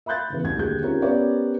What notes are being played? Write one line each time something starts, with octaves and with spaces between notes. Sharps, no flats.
E5 B5 C6 F#6 G6 A6
C#3 E3 B3
C2 G#6
D#1 D2 G3 G#4 G6
C4 C#4 D#4 F4 G4 A#4
B3 C#4 G4 A#4 C#5 D5